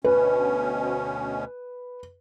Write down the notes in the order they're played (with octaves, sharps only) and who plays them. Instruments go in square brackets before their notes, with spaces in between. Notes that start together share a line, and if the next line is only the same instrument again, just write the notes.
[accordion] D2 B2 C#4 [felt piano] B4